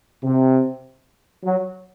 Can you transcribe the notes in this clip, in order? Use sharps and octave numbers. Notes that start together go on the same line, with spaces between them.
C3
F#3